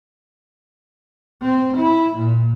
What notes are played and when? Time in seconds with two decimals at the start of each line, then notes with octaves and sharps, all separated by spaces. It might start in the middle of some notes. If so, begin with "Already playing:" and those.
1.42 C4
1.77 E4
2.16 A#2